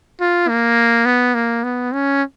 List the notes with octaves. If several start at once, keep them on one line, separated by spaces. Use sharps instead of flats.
F4
A#3
B3
A#3
B3
C#4